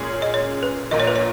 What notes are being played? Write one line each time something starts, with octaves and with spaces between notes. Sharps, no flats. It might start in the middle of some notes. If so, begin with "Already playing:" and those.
Already playing: A#2 G#3 C#4 G#4
D#5
C#5
B4
A#1 A#2 A#3 D#5
C#5
B4
C#5